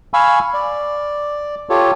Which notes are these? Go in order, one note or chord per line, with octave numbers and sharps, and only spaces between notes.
F5 G#5 B5 C#6 E6
D5
F4 G4 A4 C#5